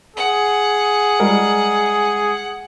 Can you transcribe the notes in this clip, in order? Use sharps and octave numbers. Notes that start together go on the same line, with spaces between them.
G#4 F#5
G3 G#3 A#4